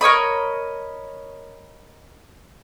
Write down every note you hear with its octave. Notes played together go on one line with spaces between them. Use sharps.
A#4 C#5 D#5 B5